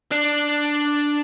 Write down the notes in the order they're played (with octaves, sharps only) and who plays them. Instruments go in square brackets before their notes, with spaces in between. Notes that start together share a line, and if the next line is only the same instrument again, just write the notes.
[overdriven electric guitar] D4